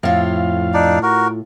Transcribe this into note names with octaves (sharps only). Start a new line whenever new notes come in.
F2 A2 F4 F5
D4 D#4 D5
F#4 A#4